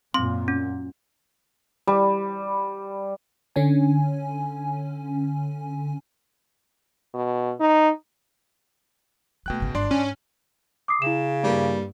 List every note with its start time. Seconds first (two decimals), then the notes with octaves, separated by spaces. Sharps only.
0.14 F#2 A#2 C4 C6
0.48 C#4
1.87 G3
3.56 D3 C#4 G#5
7.14 B2
7.60 D#4
9.46 B2 G#3 A3 G5 F#6
9.60 G#1 C#3
9.75 G1 D4 D5 C6
9.91 G#2 C#4
10.88 D6 D#6 C7
11.02 C#3 E4 E7
11.44 G2 G3 A#3